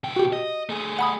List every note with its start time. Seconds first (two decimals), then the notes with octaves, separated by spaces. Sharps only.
0.04 B2 G5
0.16 F#4 G4
0.33 D#5
0.69 A3 G#4
0.99 F#5 B5 D#6